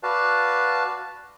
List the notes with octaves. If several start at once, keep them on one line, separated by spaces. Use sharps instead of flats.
F#4 B4 D5 F5 A5